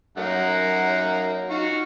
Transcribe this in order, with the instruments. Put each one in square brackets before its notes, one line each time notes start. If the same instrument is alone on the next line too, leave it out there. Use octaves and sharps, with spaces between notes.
[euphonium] F#2 [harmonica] A#3 D#4 F#5
[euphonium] D#4 [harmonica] F4 F#4 C#6